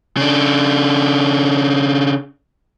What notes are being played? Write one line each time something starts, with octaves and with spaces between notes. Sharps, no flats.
C#3 D4